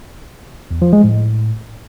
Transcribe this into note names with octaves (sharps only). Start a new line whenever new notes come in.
E2
F3
G#3
A2